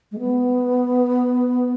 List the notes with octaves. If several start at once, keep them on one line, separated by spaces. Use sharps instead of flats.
G#3
B3